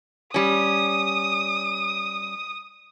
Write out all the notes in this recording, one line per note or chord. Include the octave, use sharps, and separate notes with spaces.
G3 C#4 D#6